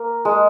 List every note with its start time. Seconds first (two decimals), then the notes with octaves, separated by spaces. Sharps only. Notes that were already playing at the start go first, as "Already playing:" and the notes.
Already playing: A#3
0.25 G#3